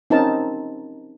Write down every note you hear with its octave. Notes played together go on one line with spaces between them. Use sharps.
C4 C#4 D#4 A#4 A5